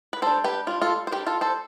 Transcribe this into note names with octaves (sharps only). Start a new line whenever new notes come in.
B4
G3 D4 A4 C5
G4 B4
G3 D4 F4
F4 A4
C5
G3 D4 G4 B4
F4 A4
A4 C5